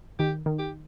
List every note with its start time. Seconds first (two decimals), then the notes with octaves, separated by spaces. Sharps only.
0.19 D#3 G4
0.46 D#3
0.59 G4